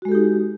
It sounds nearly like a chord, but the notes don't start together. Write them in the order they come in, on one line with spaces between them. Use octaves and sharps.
F#4 G#3 A4 G4 D#4